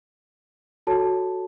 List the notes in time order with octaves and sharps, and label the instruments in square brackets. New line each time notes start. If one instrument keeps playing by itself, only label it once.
[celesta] F#4 A4 C#5 A5